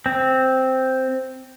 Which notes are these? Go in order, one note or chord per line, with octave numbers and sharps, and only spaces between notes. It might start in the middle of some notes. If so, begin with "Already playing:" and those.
C4